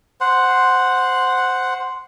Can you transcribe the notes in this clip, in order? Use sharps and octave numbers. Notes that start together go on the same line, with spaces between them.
C5 F#5